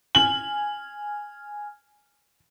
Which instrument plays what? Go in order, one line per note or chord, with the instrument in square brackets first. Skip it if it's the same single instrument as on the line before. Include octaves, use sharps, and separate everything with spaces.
[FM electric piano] G#5 F6 G#6 [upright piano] F#7